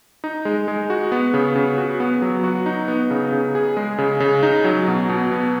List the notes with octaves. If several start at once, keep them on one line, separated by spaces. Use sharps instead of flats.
D#4
G#3
G#3
F#4
B3
C#3
C#3
F#4
B3
F#3
F#4
D#4
B3
C#3
C#3
G#4
G#3
C#3
C#3
D#4
F#3
B2
B2
B3